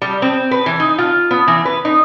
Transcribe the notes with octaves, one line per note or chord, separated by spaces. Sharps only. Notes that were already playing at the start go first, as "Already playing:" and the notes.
G3
C4
B4
E3
D#4
F4
B3
E3
B4
D#4